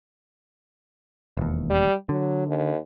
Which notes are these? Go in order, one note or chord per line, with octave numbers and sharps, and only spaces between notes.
E1 D#2
G3
D3 F#3
D#2